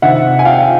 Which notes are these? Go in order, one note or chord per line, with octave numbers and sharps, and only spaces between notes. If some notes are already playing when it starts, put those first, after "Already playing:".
C3 D#3 E5 F#5
G#5
F5 G5